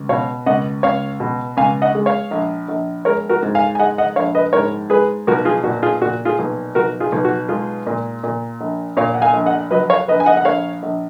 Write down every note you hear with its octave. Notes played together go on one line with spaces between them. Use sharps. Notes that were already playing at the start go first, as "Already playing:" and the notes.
Already playing: C#2
B2 C#5 F5
C#2 D#5 F#5
C#2 C#5 F5
B2
C#2 F5 G#5
D#5 F#5
G#3
C#5 F5
A#1
A#1
G#3 A#4 C#5
F#4 A#4
G#2
F5 G#5
G#5
G#3 D#5 F#5
D#5 F#5
A#1 C#5 F5
B4 D#5
G#2 A#4 C#5
G#3 G#4 B4
B1 F#4 A#4
F4 G#4
A#2 F#4
F4 G#4
A#2 F#4
F4 G#4
B1
B1 F#4 A#4
F4 G#4
B1
F#4
G#3 F4 G#4
A#2
A#2
A#1
A#2 C#5 F5
F#5
F5 G#5
A#1
D#5 F#5
F#3 B4 D#5
C#5 F5
A#1 B4 D#5
G#5
D#5 F#5
F#5
A#1 C#5 F5
A#1